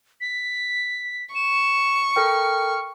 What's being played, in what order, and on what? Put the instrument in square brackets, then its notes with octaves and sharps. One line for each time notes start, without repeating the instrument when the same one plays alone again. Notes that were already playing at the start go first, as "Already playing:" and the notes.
[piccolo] B6
[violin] C#6 [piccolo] E7
[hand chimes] A4 A#4 G5 [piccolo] F6